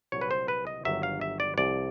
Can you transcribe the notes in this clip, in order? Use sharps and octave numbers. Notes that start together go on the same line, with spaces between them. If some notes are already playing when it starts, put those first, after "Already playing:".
C2 A#2 F#3 C#5
B4
C5
B4
D#5
G1 G2 D#3 F#3 E5
F5
E5
D5
C2 C3 F3 D5